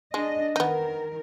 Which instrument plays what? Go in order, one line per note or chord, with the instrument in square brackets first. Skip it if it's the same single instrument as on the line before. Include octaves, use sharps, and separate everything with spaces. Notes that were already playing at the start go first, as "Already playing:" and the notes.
[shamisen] G#3 [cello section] D4 D#5
[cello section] D#3 A#4 [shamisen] B3 D#4